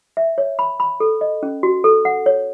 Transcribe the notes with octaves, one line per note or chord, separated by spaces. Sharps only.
E5
C#5
B5
B5
A4
D#5
C#4
F#4
A4
F#5
C#5